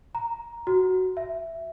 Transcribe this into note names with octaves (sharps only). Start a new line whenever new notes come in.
A#5
F#4
E5